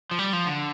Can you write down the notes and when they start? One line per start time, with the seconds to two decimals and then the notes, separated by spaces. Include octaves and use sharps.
0.11 F3
0.19 G3
0.33 F3
0.46 D3